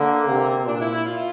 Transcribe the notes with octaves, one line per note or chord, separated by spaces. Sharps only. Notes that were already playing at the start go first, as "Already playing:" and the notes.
Already playing: D3 A#3
C3
A#2 D4
E4
E4
F4